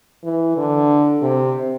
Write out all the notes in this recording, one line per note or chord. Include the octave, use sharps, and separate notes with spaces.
E3
D3
C3